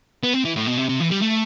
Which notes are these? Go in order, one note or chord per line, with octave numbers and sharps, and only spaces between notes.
B3
C4
E3
A2
B2
C3
C3
E3
G3
A3